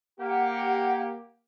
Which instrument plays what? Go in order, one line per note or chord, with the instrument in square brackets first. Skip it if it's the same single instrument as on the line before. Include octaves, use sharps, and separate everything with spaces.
[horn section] A#3 G4 [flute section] F#5